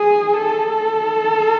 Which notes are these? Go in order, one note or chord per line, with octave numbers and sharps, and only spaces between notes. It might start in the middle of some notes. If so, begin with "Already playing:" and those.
Already playing: G#4
A4